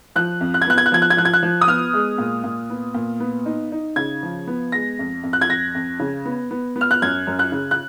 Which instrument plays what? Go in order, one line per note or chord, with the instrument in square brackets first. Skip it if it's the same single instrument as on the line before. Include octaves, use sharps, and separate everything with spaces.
[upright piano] F3 F#6
F2
F#6
G#6
B3 F#6
G#6
F#6
F3 G#6
F#6
G#6
F3 F#6
G#6
F#6
F3
D#6
B3 F6
G#3
A#2
A#2
B3
A#2
B3
D#4
D#4
C#3 G#6
F3
B3
G#3 A#6
F2
F2
F#6
G#6
F2 A#6
F2
C#3
B3
B3
B3
F6
F#6
F#2 G#6
F#2
F#6
C#3
F#6